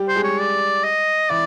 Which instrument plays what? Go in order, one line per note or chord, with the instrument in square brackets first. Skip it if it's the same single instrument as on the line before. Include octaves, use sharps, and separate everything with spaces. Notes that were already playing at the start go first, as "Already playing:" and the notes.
Already playing: [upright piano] G3 G4
[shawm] C5
[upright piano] G#3 G#4
[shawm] C#5
D5
D#5
[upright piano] E3 E4 [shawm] D5